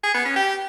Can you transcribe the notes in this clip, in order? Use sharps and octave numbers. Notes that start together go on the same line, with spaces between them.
G#4
B3
C#4
G4